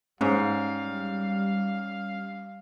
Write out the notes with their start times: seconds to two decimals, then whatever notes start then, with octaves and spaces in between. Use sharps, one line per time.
0.21 G#2 G3 C#4 F5